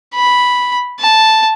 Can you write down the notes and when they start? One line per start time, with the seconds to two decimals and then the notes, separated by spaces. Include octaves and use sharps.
0.15 B5
1.00 A5